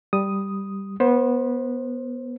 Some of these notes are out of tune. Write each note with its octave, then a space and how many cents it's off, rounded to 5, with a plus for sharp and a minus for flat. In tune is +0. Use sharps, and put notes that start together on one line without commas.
G3 +0 D#6 +0
B3 -15 C5 +20